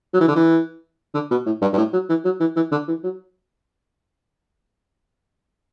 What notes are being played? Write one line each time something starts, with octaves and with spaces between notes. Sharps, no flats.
F#3
E3
D3
E3
D3
B2
A2
G2
G2
A2
F#3
E3
F#3
E3
E3
D3
E3
F#3